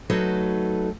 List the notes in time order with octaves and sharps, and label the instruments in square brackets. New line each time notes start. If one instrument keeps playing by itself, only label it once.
[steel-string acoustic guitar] F#3 A3 D#4 F#4 A4 B4